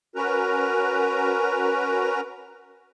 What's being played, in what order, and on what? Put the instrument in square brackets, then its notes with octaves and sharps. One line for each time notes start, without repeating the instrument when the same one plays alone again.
[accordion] C#4 F#4 A#4 B4 A#5